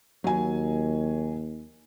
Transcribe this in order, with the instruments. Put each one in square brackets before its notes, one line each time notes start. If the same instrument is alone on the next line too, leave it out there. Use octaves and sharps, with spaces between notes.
[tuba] D#2 [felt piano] F#3 G#5